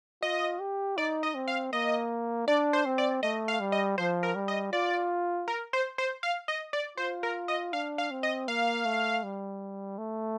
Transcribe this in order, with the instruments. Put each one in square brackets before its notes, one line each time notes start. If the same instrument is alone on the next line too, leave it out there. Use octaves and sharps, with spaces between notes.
[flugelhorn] F4 [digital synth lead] D#5
[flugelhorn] G4
[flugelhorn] D#4 [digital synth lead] D5
[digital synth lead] D#5
[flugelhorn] C4
[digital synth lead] F5
[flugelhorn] A#3 [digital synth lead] D#5
[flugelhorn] D4 [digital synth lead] D5
[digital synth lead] C5
[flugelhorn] C4
[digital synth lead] D5
[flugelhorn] A3 [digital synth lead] D#5
[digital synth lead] F5
[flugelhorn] G3
[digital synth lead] D#5
[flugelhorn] F3 [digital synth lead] C5
[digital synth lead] A#4
[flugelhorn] G3
[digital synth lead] D#5
[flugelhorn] F4 [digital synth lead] D5
[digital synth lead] A#4
C5
C5
F5
D#5
D5
[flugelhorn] F4 [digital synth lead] C5
[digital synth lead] A#4
D#5
[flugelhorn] D4 [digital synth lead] F5
[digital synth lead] F5
[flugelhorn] C4
[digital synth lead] D#5
[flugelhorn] A#3 [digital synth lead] F5
[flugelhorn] A3
G3
A3